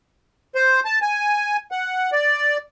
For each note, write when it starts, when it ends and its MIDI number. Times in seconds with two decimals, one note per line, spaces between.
0.55 0.80 72
0.85 0.99 81
1.02 1.57 80
1.72 2.10 78
2.12 2.57 74